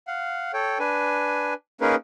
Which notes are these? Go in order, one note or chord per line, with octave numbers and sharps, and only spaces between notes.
F5 F#5
A4 C#5 G5
D4 B4 G#5
A#3 C#4 D#4 G#4 A#4 B4